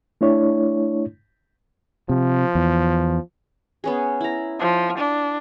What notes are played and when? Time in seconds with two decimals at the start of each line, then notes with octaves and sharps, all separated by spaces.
0.21 A3 D4 E4 C#5
2.09 C3 F3
2.55 E2
3.84 B3 C#4 G#4
4.21 E4 A#5
4.60 F3
4.98 D4